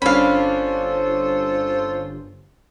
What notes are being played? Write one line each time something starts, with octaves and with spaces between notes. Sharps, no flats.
G1 C#4 D4 F4 A4 C5 F5 B5